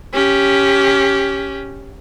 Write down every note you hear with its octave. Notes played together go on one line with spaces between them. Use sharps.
C#4 G4